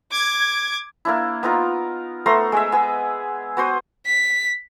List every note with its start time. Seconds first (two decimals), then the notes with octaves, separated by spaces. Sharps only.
0.12 D6 G#6
1.05 A#3 D4 E4
1.43 B3 D#4 F4 A#4
2.26 A3 B3 A#5 C6
2.52 G#3 G#4 E5
2.72 B3 G#4
3.57 B3 F#4 C5 D#6
4.06 B6